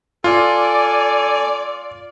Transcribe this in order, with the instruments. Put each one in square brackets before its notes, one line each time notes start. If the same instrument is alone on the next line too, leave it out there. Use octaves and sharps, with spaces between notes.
[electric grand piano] F4 [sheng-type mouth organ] A4 G#5 [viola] D5